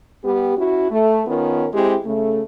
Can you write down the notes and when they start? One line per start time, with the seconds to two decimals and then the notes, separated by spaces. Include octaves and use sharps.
0.23 G3 B3 G4
0.57 C#4 E4 F#4
0.90 A3
1.26 D#3 B3 C#4 F4 A#4
1.73 G#3 C4 E4 G4
2.05 C#3 A3